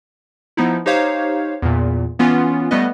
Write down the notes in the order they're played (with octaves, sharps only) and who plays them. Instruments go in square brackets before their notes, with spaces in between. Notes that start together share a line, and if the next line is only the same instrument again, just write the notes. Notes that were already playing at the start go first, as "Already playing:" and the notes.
[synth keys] F3 B3 D#4 E4
D#4 G4 C5 C#5 F5
E2 A#2
E3 B3 C#4 F4
G3 A3 B3 B4 D#5